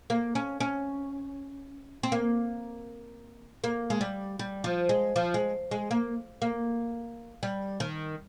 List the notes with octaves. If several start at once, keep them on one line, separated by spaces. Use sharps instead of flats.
A#3
C#4
C#4
C4
A#3
A#3
G#3
G3
G3
F3
G#3
F3
G#3
G#3
A#3
A#3
G3
D#3